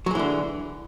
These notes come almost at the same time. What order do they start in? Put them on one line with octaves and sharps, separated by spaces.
F#3 G#3 E3 D3